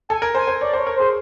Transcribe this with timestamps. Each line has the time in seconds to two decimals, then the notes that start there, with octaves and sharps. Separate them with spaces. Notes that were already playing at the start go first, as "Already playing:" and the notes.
0.09 A4 G#5
0.22 A#4
0.35 C5 G#5
0.47 C5
0.61 C#5 D5
0.73 C5
0.78 C#5
0.87 A#4
0.96 G#4 C5